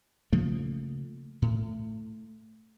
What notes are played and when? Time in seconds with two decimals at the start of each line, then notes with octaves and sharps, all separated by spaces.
0.33 C#3 F3 A3 A#3
1.42 A2